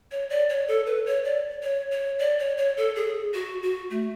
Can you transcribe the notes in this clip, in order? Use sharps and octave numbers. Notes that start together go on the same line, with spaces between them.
C#5
D5
C#5
A4
B4
C#5
D5
C#5
C#5
D5
C#5
C#5
A4
G#4
F#4
F#4
A3